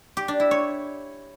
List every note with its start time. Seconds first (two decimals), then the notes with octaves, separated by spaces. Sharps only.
0.17 G4
0.28 D4
0.40 E4
0.51 C#5